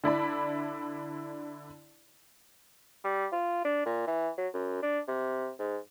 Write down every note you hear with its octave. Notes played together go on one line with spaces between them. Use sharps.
D3 E4 D5 B5
G3
F4
D4
A#2
E3
F#3
F#2
D4
C3
G#2